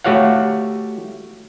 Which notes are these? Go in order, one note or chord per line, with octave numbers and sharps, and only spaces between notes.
A3 F#4 G4 C#5 F5 F#5